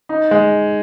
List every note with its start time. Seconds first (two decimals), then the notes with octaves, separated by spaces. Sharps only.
0.09 D#4
0.31 G#3